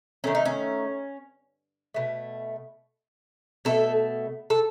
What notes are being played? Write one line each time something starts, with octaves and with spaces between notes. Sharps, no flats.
D#3 A3 C#4
D#4
C#4
B2 A3
B2 A3 A4
A4